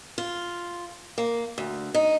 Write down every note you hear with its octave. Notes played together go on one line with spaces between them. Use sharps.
F4
A#3
D2
D#4